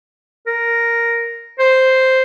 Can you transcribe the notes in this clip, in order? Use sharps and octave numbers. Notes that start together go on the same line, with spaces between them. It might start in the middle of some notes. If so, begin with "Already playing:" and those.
A#4
C5